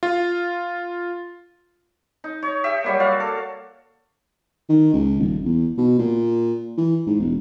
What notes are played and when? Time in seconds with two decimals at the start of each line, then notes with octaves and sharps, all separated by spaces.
0.03 F4
2.24 D#4
2.43 C#5
2.64 G4 E5
2.84 F#3 G3 A#3
3.00 F#4 D5 F5
3.20 A4
4.69 D#3
4.94 C#2
5.20 D#1
5.45 E2
5.78 B2
5.99 A#2
6.78 E3
7.07 G#2
7.19 E1